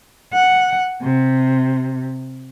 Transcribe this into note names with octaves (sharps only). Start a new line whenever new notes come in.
F#5
C3